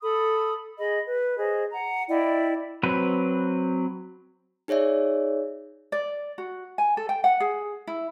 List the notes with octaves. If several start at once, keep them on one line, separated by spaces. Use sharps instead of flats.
A4 B5 D#6
G#4 D#5 B5
B4
G#4 C5 D#5
F#5 A#5
E4 D5 D#5 G5
F#3 C4 B4
D#4 G#4 C#5 D5 E5
D5
F#4
G#5
A4
G5
F#5
G#4
E4